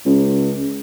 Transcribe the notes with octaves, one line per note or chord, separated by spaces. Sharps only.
C#2